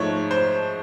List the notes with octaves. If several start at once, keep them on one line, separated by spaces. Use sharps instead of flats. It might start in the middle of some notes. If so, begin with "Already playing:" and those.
Already playing: G#2 F3 A3 C#5
C5